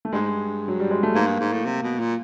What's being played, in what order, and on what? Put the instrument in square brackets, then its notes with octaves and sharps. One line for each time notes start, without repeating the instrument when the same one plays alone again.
[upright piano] A3
[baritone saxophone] G2 [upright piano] G#3
[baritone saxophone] G#2
G2
[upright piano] F#3
G3
G#3
A3
[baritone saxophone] G#2 [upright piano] A#3
[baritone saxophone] G2
G#2
A2
C3
B2
A#2